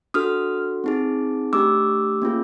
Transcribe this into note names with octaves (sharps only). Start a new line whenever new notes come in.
D4 F#4 A4 D#6 F6
C4 D#4 G#4
A3 D4 G4 D6 E6
A#3 C#4 F4 G#4